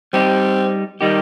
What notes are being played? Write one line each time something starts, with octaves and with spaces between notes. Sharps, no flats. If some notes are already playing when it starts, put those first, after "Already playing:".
G3 C4 D#4 G4
D#3 G3 D#4 G4